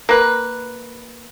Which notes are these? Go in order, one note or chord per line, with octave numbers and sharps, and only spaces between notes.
A#3 B4